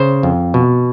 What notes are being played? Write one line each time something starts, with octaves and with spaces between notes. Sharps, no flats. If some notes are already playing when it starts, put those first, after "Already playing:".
Already playing: C#3 C5
F2
B2